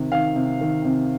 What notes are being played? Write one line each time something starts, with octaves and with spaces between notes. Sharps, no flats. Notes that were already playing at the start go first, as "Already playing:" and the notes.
Already playing: C3 D#3
D#3 F5
C3
D#3
C3